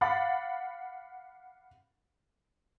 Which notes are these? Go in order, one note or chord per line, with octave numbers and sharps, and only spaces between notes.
F5 F#5 B5 D6 A6